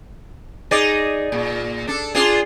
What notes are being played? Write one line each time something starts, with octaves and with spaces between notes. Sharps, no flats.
D#4 G#4 D5
A#2
D4 A4
D4 F4 G#4